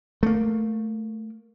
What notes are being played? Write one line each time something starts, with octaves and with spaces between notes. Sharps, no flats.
A3 A#3